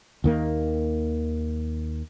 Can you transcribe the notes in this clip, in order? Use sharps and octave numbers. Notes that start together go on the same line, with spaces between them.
D#2 D#3 A#3